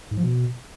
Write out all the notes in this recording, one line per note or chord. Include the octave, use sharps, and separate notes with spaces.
G#2
F3
B2